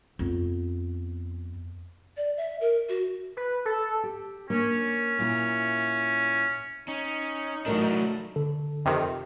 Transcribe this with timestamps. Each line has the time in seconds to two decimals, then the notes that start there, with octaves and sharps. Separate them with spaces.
0.19 F2 B3
2.17 D5
2.37 E5
2.61 A#4
2.89 F#4
3.37 B4
3.65 A4
4.03 G4
4.50 A#3 C#4 D4 C#5
5.19 A#2 E4 A#5
6.88 C#4 D#4
7.66 E3 F#3 A3 D4 A#4
8.36 D3 A4
8.85 F2 C3 D#3